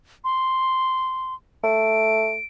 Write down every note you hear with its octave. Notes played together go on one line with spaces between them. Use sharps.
C6
A3 D7